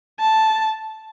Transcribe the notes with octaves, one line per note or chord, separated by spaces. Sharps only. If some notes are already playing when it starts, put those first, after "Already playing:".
A5